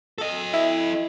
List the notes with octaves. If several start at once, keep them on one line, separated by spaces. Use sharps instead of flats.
A4 D#5
E4